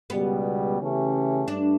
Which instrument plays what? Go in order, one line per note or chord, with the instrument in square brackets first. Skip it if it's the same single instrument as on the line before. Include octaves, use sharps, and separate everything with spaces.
[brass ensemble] C#2 B2 G3 [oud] B3
[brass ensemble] C#3 E3 A3 C#4 G4
[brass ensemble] G2 A3 [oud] D4